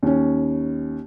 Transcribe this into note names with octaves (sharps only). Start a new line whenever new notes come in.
D#2 C#4